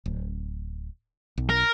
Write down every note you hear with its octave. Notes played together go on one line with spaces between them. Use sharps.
D1
B1
A#4